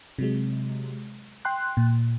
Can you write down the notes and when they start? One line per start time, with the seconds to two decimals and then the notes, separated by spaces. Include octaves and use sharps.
0.19 C3 F#3 G#3
1.45 G5 C6 F#6
1.77 A#2